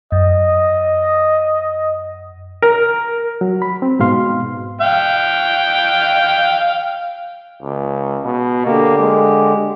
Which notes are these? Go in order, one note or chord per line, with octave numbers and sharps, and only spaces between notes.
F#2 D#5
A#4
F#3
B5
C4
G#2 B2 F5 C6
F5 G5
C#2
B2
D3 A#3 G4
G#3